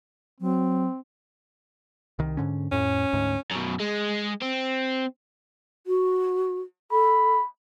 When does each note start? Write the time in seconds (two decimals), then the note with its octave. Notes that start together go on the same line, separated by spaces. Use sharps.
0.40 F#3 C4
2.19 C2 D#3
2.37 G#2 D3 C#4
2.72 F2 A2 C#4
3.13 D2 G#2
3.51 F#2 B2
3.79 G#3
4.42 C4
5.87 F#4
6.92 A4 B5